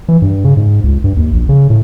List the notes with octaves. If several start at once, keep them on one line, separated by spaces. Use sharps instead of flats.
E3
G2
C#3
G#2
C#2
G2
D#2
A#1
C#3
A2